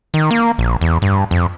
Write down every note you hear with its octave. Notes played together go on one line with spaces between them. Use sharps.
D#3
A#3
A#1
E2
G2
F2